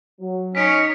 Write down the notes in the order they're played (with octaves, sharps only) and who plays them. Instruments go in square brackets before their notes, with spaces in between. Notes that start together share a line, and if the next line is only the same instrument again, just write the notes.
[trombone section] F#3
[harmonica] C#4 [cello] D#4 C#5 [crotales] B6 D7